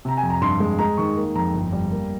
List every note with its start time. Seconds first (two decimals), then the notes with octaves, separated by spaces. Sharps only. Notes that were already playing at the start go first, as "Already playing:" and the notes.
0.05 C3 A#5
0.17 G#5
0.23 F2
0.30 A#5
0.41 G2 C6
0.60 G#3
0.79 G#3 A#5
0.97 D#3 C#6
1.16 A#3
1.35 F2 A#5
1.54 G1
1.72 G3
1.91 A#3